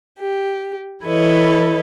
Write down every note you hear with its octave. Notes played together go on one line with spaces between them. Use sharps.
G4
E3 E4 A4 B4 C#5 D#5